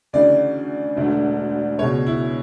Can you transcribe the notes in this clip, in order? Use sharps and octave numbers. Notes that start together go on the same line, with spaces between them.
D2 C#3 E3 D5
E1 D2 D3 A3
C#2 B2 G#3 B3 C#5
E4